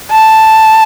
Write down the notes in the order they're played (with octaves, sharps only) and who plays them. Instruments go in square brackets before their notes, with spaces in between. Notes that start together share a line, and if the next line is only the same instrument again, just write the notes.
[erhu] A5